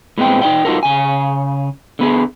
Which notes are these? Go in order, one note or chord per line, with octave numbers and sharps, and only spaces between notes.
A2 G#3 B3 C4 G5
D#4 D5 G5
D#4 F4 F#4 A4 A#4
C#3 G#5
D3 B3 G#4